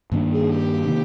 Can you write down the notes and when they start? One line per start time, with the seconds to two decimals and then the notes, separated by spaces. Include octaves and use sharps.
0.12 G2 D#3 A#3 D4
0.32 G#4
0.50 G4
0.87 C3 D#3 A#3